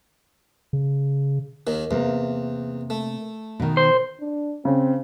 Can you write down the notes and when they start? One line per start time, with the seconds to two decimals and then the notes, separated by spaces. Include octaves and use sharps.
0.73 C#3
1.67 D#2 D#3
1.91 E2 C3 A#3
2.90 A3
3.60 B2 D#3
3.77 C5
4.20 D4
4.65 C#3 C4